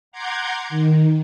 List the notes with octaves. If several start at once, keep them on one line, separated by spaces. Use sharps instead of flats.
F#5 A#5 C6 D6 G6 G#6
D#3